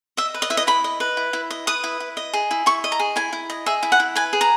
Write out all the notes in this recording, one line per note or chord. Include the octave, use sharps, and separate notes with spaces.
D#5 E5
B4
D#5
E4 E5
D#5
E4 B5
D#5
B4
E4
E4
D#5
B4 D#6
E4
E4
D#5
G#4
E4
E4 C#6
D#5
A#5
G#4
E4 G#5
E4
D#5
G#4 E5
E4
F#5
E4
B4 G#5
G#4
A#5